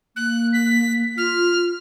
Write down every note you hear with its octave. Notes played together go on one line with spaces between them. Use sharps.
A#3 F#6
B6
F4 F6